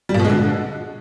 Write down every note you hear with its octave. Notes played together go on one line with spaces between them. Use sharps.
G3
A#2
B2
G#3
D3